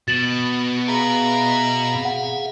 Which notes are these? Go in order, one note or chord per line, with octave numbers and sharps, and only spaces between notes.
B2 F#4 A6 E7 F#7
G#4 E5 F5 A#5 B5
F#5